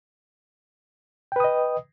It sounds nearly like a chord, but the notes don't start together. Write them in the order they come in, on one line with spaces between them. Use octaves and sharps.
G5 B4 D#6 D#5